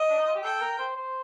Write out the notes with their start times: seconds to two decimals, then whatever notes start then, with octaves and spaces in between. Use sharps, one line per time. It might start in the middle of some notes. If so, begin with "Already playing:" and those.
Already playing: D#5
0.09 D4
0.18 D#4
0.26 F4
0.35 G4
0.43 A4 G5
0.61 A#4
0.79 C5
0.96 C5